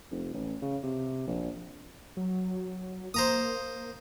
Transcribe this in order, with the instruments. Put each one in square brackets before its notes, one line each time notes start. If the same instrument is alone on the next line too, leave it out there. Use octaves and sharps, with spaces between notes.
[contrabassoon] F1
A1
C#3
C3
A#1
[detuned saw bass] F#3
[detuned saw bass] A#3 [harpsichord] C5 A#5 D#6